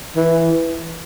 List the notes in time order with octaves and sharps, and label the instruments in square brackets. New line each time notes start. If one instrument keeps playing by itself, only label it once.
[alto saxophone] E3